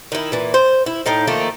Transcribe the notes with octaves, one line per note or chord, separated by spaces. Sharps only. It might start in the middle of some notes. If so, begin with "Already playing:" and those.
D#3 E4
A#2 E3
C5
E4
A2 D#4 F5 G5
D#3 F3 A3 A#3